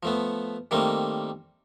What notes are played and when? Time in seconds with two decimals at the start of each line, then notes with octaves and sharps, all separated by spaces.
0.03 F3 A3 B3
0.71 D#3 G3 A3 A#3 C4